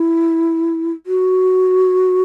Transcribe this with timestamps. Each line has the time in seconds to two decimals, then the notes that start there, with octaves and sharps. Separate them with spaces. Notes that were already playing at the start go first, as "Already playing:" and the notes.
Already playing: E4
1.06 F#4